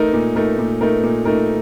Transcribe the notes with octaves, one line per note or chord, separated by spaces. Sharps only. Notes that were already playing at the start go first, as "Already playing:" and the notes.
Already playing: A3 D#4 A#4
A#2
A3 D#4 A#4
A#2
A3 D#4 A#4
A#2
A3 D#4 A#4